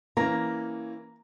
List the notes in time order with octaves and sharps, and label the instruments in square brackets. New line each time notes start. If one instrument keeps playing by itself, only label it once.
[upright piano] E3 A#3 C#4 [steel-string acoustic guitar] A#5